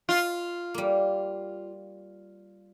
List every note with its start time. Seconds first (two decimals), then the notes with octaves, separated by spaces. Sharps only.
0.09 F4
0.74 G3 A#3